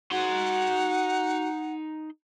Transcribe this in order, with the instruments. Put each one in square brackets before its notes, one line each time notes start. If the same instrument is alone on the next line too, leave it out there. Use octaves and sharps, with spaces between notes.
[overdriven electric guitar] D#4 C6 [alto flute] F#4 [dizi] F#5